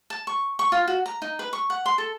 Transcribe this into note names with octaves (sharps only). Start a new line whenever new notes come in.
A5
C#6
C#6
F4
F#4
A#5
D#4
B4
C#6
F#5
C6
A4